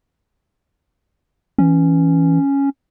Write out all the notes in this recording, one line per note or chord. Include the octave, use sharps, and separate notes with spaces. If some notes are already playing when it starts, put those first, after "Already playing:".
E3 C#4